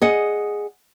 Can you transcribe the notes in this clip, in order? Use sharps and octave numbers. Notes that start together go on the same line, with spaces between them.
G#4 D#5 F#5